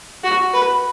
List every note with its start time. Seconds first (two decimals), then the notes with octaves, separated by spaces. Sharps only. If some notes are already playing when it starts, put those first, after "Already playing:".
0.24 F#4
0.54 B4